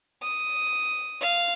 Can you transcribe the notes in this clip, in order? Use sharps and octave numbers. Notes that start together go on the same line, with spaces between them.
D#6
F5